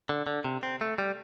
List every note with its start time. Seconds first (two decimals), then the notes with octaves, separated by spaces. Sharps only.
0.09 D3
0.27 D3
0.44 C3
0.63 C4
0.81 A3
0.98 G3